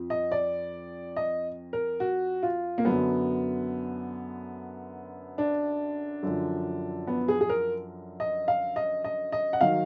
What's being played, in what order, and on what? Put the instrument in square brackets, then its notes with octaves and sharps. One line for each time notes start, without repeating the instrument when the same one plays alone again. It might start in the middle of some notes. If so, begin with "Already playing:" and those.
Already playing: [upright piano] F2 F3
D#5
D5
D#5
A#4
F#4
F4
A#3
F#2 D3 F#3 B3
D4
F#2 D3 F3
B3
G#4
G#4
A#4
D#5
F5
D#5
D#5
D#5
F#5
D#3 F#3 F5